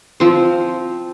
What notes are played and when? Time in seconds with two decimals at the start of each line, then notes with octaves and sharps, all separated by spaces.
0.20 F3 C4